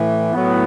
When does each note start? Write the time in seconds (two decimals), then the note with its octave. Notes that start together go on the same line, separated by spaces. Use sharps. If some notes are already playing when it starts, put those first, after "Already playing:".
Already playing: A2 E3
0.32 A2 F#3 B3